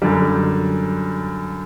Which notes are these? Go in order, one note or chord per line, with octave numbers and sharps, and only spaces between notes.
F#2 D3 G3